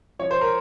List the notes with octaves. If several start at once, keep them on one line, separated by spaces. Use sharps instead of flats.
F3 C#5
C5
A#4